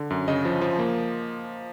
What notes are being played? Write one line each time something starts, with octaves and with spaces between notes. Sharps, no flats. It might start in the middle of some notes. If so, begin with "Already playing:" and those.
Already playing: D3
F#2
C#3 D#5
F3
F3
A#3